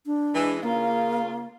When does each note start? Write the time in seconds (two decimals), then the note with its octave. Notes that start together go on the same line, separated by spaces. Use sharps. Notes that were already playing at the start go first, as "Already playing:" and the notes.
0.06 D4
0.34 E3 G#3
0.63 C#3 A#3 F4